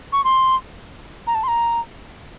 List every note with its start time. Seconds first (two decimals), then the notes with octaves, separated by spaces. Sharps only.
0.13 C#6
0.24 C6
1.27 A#5
1.35 A5
1.44 C6
1.48 A#5